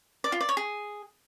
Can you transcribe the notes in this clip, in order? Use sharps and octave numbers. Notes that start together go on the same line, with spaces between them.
D5
F4
D5
C#5
G#4